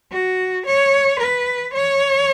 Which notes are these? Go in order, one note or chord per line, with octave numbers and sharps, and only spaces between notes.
F#4
C#5
B4
C#5